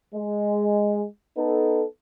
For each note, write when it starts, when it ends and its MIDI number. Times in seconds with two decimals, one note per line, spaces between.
0.15 1.05 56
1.38 1.84 59
1.38 1.84 63
1.38 1.84 69